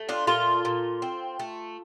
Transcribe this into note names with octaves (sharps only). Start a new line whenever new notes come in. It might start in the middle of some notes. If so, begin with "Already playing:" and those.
Already playing: A3
D4 F4
A#2 F4 A4
A#2
C4
A3